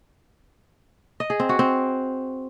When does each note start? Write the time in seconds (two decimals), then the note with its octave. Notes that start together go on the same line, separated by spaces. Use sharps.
1.20 D#5
1.30 G#4
1.40 C4
1.49 F#4
1.59 C4